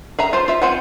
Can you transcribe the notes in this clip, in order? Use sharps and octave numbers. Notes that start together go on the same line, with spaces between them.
G#4 E5 A#5
F4 C5
F4 E5
C4 F4 C5 F#5 G#5